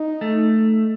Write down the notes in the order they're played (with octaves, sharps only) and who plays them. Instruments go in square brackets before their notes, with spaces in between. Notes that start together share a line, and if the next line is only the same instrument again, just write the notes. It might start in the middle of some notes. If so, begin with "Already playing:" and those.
Already playing: [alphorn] D#4
[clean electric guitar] A3